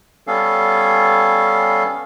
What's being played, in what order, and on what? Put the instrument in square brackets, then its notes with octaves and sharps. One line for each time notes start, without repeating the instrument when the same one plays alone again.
[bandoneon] G3 B3 C#4 A4 F5